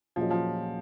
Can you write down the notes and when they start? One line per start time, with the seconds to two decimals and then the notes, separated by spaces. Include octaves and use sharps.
0.16 A#2 F3 F#3 C#4 G#4 D#5
0.30 F3